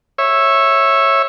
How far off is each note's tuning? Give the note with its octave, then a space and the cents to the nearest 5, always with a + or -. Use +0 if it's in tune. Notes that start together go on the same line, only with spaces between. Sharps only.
C#5 -15 E5 +0